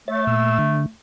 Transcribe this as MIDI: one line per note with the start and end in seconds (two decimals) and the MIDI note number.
0.08 0.90 57
0.08 0.25 73
0.08 0.25 76
0.08 0.25 93
0.27 0.58 46
0.27 0.58 88
0.59 0.86 50